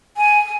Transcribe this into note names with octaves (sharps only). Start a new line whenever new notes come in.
G#5